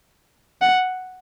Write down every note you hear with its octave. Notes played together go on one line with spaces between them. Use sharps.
F#5